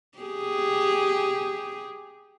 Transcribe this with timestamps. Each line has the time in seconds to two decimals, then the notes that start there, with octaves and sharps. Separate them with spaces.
0.18 G4 G#4